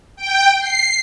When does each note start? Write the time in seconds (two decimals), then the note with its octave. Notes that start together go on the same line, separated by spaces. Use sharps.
0.16 G5
0.59 C7